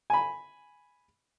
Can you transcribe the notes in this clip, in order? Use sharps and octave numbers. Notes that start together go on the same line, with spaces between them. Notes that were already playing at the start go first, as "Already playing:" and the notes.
G#5 B5